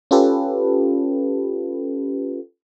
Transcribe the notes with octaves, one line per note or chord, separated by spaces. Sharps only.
C#4 F4 G4 A4 B4